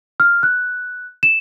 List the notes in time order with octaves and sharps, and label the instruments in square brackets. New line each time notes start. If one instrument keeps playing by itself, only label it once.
[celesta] F6
F#6
E7